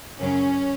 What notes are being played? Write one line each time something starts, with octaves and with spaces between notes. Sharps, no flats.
F#2 C#3 F#3 C#4